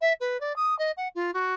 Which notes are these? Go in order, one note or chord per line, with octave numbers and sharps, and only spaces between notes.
E5
B4
D5
D#6
D#5
F#5
F4
F#4